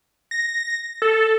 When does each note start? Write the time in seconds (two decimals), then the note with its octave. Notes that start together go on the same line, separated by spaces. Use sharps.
0.31 A#6
1.02 A4